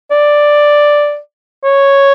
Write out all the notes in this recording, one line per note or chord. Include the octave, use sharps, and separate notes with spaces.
D5
C#5